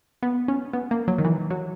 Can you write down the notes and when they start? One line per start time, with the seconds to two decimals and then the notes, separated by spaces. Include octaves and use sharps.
0.23 B3
0.48 C#4
0.73 B3
0.91 A#3
1.08 F#3
1.18 D#3
1.25 E3
1.50 F#3